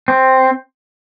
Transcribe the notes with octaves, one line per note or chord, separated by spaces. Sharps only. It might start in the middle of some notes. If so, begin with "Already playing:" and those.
C4